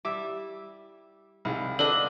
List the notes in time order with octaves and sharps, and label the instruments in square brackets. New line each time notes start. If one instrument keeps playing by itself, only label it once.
[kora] G3 E4 E5 [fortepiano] D6
[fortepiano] C2 [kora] G#2 F3 G#3
[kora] B3 F4 C5 [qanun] D4 D#5 [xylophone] A4